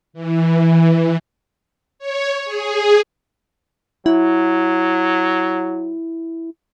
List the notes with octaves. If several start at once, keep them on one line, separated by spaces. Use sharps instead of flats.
E3
C#5
G#4
F#3 E4